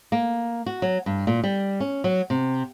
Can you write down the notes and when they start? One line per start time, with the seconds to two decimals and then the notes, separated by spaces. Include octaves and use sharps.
0.12 A#3
0.66 F#4
0.82 F#3
1.06 G2
1.27 A#2
1.44 G3
1.80 C#4
2.04 F#3
2.30 C3